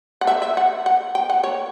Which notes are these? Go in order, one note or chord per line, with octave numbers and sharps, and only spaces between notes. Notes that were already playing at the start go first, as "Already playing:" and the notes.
F#5
E5
E5
F#5
F#5
G5
F#5
C#5